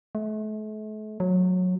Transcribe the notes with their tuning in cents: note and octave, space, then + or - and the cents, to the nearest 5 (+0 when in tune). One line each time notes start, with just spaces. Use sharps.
A3 -40
F#3 -20